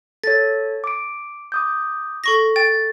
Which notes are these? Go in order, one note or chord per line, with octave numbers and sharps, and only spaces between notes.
A4 C#5 A6
D6 D7
D6 D#6 G6
A4 C#6 A#6
G5 A6